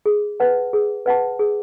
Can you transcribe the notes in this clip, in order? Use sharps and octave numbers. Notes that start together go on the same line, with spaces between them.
G#4
B4 F#5 A5
G#4
B4 F#5 A5
G#4